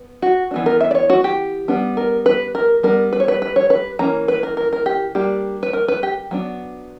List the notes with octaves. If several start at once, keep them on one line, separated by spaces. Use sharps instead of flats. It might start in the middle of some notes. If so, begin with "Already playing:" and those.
Already playing: B3
F#4
E3 B3 D4
A#4
E5
D5
C#5
F#4
G4
G3 B3 D4
A#4
B4
A#4
G3 B3 D4 A#4
B4
C#5
B4
B4
C#5
B4
E3 A#3 C#4 A#5
B4
A#4
A#4
A#4
G4
G3 A#3 D4 G4
B4
A#4
B4
G4
F#3 B3 D4